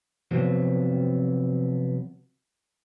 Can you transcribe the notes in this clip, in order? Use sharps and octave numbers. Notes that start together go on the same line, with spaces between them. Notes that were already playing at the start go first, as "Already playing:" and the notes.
C3 F3 F#3 B3 C4